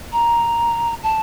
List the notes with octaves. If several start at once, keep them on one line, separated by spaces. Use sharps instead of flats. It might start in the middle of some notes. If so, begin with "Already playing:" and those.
A#5
A5